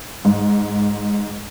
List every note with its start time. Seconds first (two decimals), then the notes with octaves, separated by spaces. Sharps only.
0.25 G#2